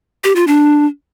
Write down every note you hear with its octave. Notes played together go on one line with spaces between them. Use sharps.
G4
F4
D4